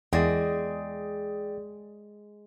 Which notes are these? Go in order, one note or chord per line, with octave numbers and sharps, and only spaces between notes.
E2 G#3 G#4 D5 G5